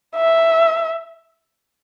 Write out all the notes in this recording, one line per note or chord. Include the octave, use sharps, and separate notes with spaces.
E5